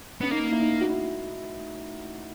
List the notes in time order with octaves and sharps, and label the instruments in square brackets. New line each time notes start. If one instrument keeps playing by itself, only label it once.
[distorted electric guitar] B3 [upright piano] C#4
[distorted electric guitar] A#3 [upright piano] D#4
[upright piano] E4
D#4
F#4
E4